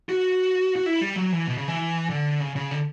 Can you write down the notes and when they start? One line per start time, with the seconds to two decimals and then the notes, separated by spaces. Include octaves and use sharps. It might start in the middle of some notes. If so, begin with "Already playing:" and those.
0.09 F#4
0.76 F#4
0.86 E4
1.01 G3
1.16 F#3
1.32 E3
1.47 B2
1.57 C#3
1.68 E3
2.10 D3
2.40 C#3
2.56 C#3
2.71 D3